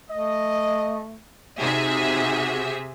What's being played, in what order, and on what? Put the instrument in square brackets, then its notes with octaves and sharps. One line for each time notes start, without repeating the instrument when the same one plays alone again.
[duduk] A3 [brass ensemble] D#5
[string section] C3 G#4 E5 [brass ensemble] C4 F#4 [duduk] D#4